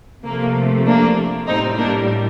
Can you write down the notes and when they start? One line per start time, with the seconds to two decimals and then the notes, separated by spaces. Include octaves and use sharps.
0.25 C3 F3 A3 A#3
0.86 A#3 D4
1.47 A2 G3 C4 D#4
1.78 A#3 D4